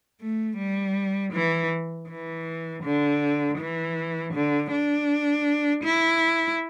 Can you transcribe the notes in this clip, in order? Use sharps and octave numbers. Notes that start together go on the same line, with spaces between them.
A3
G3
E3
E3
D3
E3
D3
D4
E4